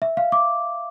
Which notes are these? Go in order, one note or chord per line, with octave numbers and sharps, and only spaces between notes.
E5
F5
D6